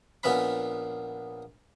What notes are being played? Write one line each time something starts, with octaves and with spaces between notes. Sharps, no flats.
A#1 A#2 B3 C#4 E5 B5